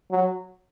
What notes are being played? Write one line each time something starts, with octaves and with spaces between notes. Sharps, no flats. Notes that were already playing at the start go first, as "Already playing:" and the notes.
F#3